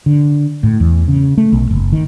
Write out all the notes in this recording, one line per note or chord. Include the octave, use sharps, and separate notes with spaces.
D3
A2
E2
C#3
A3
B1
F#1
D#3